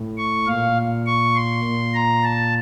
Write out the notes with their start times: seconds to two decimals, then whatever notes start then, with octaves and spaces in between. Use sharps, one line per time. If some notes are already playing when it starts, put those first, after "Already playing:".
Already playing: A2
0.18 C#6
0.47 A#2 F5
1.07 C#6
1.35 C6
1.64 A#2
1.94 A#5
2.23 A5